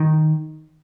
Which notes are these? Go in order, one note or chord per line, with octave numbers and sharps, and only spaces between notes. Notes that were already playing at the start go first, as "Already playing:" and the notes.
Already playing: D#3